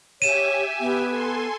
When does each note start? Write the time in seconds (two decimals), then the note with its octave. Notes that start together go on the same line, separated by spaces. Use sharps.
0.22 G4 C#5 E5 G#5 D#7 E7
0.80 B3
1.10 A4 G#5 C6